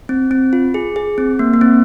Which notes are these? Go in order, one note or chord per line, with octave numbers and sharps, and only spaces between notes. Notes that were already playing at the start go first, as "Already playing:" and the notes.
C4
C4
F4
G#4
G#4
C4
A#3
A#3
C4